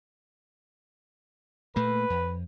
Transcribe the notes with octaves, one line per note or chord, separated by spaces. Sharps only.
A#2 A3 A#3 B4
F2